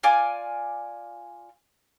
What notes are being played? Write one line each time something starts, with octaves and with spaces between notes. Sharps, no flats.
F4 D5 G#5 D6